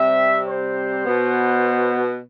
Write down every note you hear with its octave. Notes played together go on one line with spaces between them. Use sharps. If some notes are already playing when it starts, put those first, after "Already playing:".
Already playing: C3 G3 C4 E5
C5
B2 B3